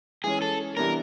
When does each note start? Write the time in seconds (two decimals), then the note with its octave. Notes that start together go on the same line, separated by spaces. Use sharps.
0.24 E3 G#3 C#4 G#4
0.42 A4
0.77 C3 E3 G3 B3 D4 A#4